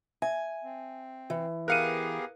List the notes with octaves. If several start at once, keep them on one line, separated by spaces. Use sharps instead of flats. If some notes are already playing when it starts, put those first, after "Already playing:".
E5 G#5
C4
E3
B3 G4 G#4 A#4 F5 F#6 C#7 D#7